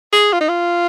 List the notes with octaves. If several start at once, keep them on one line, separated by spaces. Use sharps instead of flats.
G#4
F4
D#4
F4